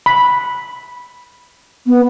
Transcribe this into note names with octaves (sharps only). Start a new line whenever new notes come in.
B5
B3